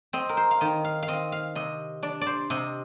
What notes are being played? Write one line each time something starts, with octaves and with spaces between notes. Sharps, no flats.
C4 D#5
A#4
C5
F5
D#3 D#5
F5
F5
C4 D#5
F5
C3 D#5
D4 D5
D5
C5
C3 D#5